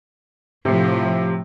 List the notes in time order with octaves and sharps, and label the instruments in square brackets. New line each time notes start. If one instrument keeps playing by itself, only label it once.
[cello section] A2 F3 [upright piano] C3